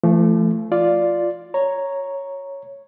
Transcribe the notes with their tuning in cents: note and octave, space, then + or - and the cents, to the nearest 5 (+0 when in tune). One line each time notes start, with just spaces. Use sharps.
F3 -45 A3 +0
F4 +0 D5 +0
C#5 +0 A#5 +0